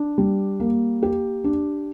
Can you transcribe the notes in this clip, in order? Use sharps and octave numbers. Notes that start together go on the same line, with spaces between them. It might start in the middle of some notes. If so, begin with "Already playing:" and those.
Already playing: D4
G3
A#3
G4
D4